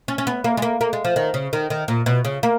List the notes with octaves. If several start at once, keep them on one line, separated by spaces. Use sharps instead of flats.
C#4
C#4
B3
A#3
G#3
A#3
A#3
G#3
F3
D#3
C#3
D#3
D#3
A#2
B2
C#3
A#3